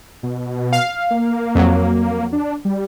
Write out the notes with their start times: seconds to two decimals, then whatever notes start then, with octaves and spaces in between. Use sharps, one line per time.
0.23 B2
0.73 F5
1.11 A#3
1.55 F2 F#3
2.33 D4
2.65 G3